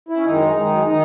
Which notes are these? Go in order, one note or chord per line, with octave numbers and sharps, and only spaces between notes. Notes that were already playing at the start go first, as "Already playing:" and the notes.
E4
C#4
F#2 D#3 G#3 D#4
F#2 D#3 G#3
D#3 D#4